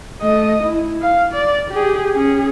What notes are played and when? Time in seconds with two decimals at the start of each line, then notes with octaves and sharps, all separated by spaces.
0.21 A3 D#5
0.64 E4
1.01 F5
1.33 D5
1.71 G4 G#4
2.13 C#4 G#4